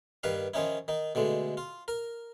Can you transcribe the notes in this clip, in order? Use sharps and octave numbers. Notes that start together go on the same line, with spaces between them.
G2 D#3 B4 F5
D#3 F3 C#4 D#4 E4
D#3 D#4
B2 D3 G#3 A3
F4
A#4